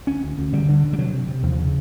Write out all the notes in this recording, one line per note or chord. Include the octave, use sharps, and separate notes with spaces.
D2 C#4
D2
D2
D3 G3
D3
D3
G3
C3 F#3
C3
C3
D#2 F3
C#3